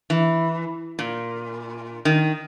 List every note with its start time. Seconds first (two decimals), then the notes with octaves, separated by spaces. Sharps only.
0.10 E3
0.99 A#2
2.05 D#3